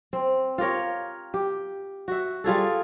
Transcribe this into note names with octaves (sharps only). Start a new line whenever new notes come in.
C4
F4 G4 A#4 C#5
G4
F#4 E5
G3 F4 G#4 A4